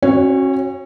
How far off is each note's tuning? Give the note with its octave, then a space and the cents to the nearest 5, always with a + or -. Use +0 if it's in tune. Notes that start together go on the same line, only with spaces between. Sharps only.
C#4 -40 F#4 -5 C#5 +0